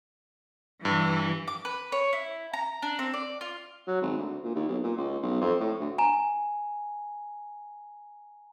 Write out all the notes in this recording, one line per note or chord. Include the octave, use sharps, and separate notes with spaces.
G2 E3
D6
B4
C#5
E4
A#5
D4
C4
D5
F4
F#3
G#1
D2
A#2
D#2
B1
A#2
C#2
B1
F2
A2
D2
G#5 A#5